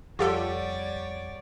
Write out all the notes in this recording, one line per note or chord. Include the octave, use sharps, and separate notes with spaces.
F2 G3 F4 G4 A4 C#5 D5 F#5